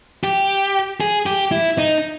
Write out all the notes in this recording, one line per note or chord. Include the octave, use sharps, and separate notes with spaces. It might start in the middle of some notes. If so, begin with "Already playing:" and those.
G4
G#4
G4
E4
D#4